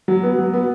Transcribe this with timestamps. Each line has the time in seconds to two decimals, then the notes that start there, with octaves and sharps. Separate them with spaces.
0.08 F#3
0.23 B3
0.39 F#3
0.54 B3